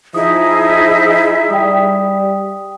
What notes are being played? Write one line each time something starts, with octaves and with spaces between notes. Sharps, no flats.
F3 D#4 E4 G#4 E5 D#6
G3 G5 D#6